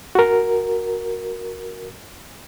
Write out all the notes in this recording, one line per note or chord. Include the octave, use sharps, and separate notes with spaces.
F#4 A#4